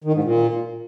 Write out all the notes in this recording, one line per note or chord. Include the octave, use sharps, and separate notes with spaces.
D#3
G#2
A#2